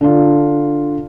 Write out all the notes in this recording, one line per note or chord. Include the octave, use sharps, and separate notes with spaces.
D3 D4 F4